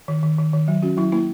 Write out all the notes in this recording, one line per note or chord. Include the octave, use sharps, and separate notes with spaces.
D#3
D#3
D#3
D#3
F#3
C#4 F#4
F#3 E4
A#3 E4